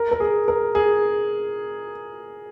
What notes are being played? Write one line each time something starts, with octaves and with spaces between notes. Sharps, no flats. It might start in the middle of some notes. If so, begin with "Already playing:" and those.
Already playing: A#4
A#4
G#4
A#4
G#4